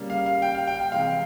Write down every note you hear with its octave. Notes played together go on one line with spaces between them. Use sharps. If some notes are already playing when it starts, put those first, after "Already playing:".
Already playing: C#3 G3 A#3
F5
F5
G5
F5
G5
G5
C3 E3 G#3 F5